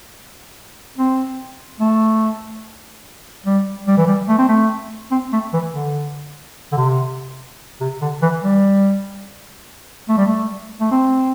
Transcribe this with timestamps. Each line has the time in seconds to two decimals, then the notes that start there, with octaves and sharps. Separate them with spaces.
0.98 C4
1.80 A3
3.46 G3
3.87 G3
3.97 E3
4.07 G3
4.28 A3
4.38 C4
4.49 A3
5.11 C4
5.33 A3
5.53 E3
5.73 D3
6.72 D3
6.77 C3
7.81 C3
8.01 D3
8.22 E3
8.43 G3
10.09 A3
10.17 G3
10.26 A3
10.80 A3
10.91 C4